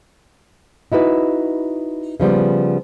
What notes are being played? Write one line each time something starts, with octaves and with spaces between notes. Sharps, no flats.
D#4 E4 F#4 B4
C#3 F3 G3 B3